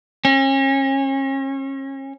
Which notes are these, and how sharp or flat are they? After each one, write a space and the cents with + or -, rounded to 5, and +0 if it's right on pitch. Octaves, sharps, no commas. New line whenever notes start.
C#4 -35